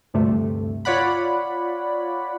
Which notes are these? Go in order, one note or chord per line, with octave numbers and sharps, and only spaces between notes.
D2 G2 C3 A3
F4 C#5 D5 F#5 B5